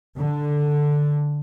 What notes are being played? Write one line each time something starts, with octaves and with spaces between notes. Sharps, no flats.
D3